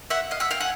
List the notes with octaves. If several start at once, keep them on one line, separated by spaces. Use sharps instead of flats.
E5 F#5
D#5 F5
E5 F#5
F5 G5
F#5 G#5